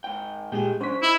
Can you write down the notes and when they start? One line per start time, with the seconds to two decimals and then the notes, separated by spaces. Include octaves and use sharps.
0.04 G#2 G5
0.52 A#2 G#3 D#4 G4 G#4 G5
0.81 F#3 C#4 D4 C5 B6
1.03 D#4 E4